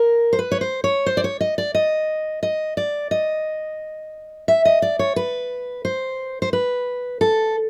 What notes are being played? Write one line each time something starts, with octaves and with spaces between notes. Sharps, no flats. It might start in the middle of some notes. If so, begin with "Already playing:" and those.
Already playing: A#4
C5
B4
C#5
C5
C#5
C5
D5
C#5
D#5
D5
D#5
D#5
D5
D#5
E5
D#5
D5
C#5
B4
C5
C5
B4
A4